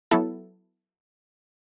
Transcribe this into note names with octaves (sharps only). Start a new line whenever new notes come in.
F#3 B3 E4 A4